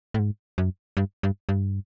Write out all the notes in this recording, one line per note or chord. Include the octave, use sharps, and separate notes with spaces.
A2
G#2
F#2
G2
G2
G2